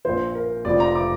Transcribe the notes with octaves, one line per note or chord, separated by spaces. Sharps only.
A#1 A#2 F3 C5
A#4
F1 F2 F3 C4 D5
A#5
D6